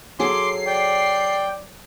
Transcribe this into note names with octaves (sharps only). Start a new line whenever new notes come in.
F#3 G#4 A4 C6 D6 C7
D5 G5